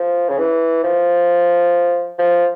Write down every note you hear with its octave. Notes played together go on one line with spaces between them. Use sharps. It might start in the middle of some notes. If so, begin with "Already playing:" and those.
Already playing: F3
C#3
E3
F3
F3